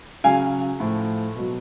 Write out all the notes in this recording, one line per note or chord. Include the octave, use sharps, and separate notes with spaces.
C#3 F#3 F5 G#5
A2 F3
B2 F#3